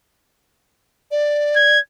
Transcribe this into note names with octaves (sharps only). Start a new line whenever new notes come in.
D5
G#6